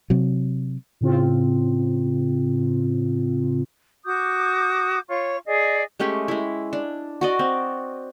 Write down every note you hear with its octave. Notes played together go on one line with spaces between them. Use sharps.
C3 F#3
A2 C#3 C4 F4
F#4 D6 D#6 G6
F4 C#5 C#6
G#4 D5 D#5
G#3 A3 C#4 G4
G#3 E4
D4
F#4 D5 D#5
C4